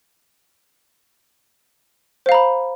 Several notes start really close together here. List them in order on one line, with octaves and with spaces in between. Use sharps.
C5 F5 A#5 B5